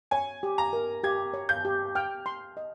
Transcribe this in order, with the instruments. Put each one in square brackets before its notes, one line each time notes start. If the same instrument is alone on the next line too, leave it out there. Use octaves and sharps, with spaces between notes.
[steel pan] C#5 [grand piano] G#5
[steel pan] G4
[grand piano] A#5
[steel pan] A#4
[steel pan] G4 [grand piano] G#6
[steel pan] C#5
[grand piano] G6
[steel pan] G4
[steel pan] G5 [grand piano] F6
[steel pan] C6
D#5